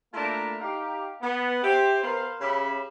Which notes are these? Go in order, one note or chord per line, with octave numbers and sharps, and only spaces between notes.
A3 A#3 D4 E4 F4 A#5
D#4 G4 F5
B3
G4 C5 E5
B3 A#4 C5 F5
C#3 C#4 G4 E5 B5